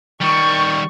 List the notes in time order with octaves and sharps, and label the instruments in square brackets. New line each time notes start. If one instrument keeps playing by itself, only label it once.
[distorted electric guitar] D#3 G3 [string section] C#6